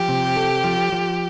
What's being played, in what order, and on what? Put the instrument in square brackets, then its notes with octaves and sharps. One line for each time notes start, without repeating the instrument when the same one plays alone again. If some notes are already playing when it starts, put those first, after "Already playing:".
Already playing: [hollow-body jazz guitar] F3 [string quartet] G4
[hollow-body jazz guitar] C3
A4
F3
F3